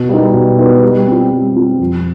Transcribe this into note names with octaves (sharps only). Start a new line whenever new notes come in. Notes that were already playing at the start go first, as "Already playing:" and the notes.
Already playing: B2
G3 B3 D#4
B2
G3 B3 D#4
G3
C4 F4
G3
C4 F4
F2